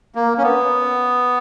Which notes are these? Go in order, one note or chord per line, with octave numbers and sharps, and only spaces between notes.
A#3
C#4
B3